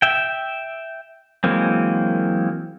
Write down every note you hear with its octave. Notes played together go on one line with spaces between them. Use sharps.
E5 G5
E3 F#3 G#3 A#3 C4